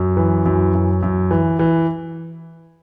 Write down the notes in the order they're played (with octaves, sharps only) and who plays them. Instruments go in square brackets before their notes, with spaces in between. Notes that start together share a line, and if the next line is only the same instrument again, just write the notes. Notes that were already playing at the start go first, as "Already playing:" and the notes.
Already playing: [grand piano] F#2
E3
F#2
F#2
F#2
E3
E3